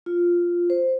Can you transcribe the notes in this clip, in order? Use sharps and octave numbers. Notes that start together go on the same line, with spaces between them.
F4
C5